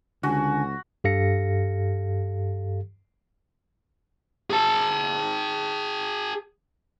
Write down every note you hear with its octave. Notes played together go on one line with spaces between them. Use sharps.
C#2 D3 F#4 G#5
G2 G4 A4 F5 A#6 C#7
G#4 A5